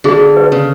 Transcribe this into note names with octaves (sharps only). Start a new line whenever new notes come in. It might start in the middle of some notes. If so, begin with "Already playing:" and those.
D3 G#4
B4
C#3